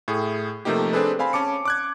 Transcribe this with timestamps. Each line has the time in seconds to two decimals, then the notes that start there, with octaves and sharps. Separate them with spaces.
0.08 A2 G#4
0.65 C3 F3 A3 A#3 D#4 G4
0.93 C4 D4 G#4 A4 B4
1.19 C4 F5 G#5 B5
1.33 C#4 A5 D6 C#7
1.65 D6 F#6 G#6